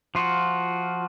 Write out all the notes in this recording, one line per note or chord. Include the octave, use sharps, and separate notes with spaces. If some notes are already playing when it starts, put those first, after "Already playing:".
F3 F4 F#4